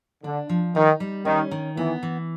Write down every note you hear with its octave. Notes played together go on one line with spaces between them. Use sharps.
D3 D4
F3
D#3 D#4
G3
D#3 C#4
D#3
E3 B3
E3